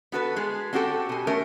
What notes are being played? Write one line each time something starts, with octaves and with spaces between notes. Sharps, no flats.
B3 F#4 A4 B4
G#3 G#4
C4 C#4 F#4 G4 A4
B2 G#5
A3 C#4 A#4